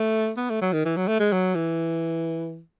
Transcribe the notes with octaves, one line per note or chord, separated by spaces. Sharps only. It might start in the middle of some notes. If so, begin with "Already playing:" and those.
Already playing: A3
B3
A3
F#3
D#3
E3
F#3
A3
G#3
F#3
E3